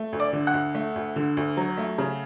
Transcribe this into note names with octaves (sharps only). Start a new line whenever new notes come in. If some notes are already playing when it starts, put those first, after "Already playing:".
Already playing: A3
D2
D5 D6
D3
F#5 F#6
D2
A3
D2
D3
D2
F#3
A3
C#3